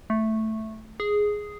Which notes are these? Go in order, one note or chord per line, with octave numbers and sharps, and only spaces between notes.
A3
G#4